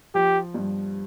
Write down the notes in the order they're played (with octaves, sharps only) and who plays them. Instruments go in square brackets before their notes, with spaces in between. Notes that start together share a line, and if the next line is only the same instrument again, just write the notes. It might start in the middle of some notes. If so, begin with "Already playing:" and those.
[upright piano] F3 [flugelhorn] G4
[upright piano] G2